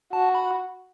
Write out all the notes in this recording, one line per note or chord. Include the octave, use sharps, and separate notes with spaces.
F#4 A5
B5